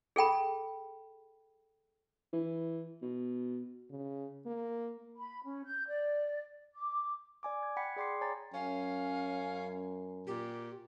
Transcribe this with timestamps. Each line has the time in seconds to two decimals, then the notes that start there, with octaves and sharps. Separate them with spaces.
0.16 G#4 A4 G5 B5
2.33 E3
3.02 B2
3.90 C#3
4.46 A#3
5.16 B5
5.44 C#4
5.64 G6
5.87 D5
6.75 D6
7.43 D5 G#5 D6
7.63 G#6
7.77 F#5 G5 B5 G#6 B6 C#7
7.96 G#4 D5 G5 C6 D6 C7
8.21 C#5 G#5 A#5 A6
8.54 F#2 C#4 F5
10.27 A#2 G4